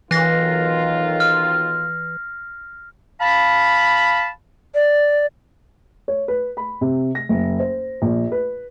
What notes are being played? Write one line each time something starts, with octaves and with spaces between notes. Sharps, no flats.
B1 D#3 E3 F4 F#6 A#6 C7
F6
F5 A5 B5
D5
C#5
B4
B5
C3
A#6
F#1
C5
A#1
B4